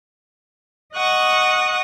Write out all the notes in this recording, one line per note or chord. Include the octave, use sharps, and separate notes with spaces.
D#5 F#5 C#6 D#6